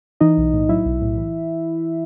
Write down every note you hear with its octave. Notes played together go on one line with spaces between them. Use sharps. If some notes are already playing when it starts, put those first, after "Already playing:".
E3 D#4 D#5
B1
A2
F#3 E4 E5
B1
A2
E3